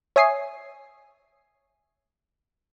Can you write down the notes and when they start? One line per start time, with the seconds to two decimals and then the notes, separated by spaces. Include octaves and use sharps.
0.16 C#5 E5 G#5 D#6 C7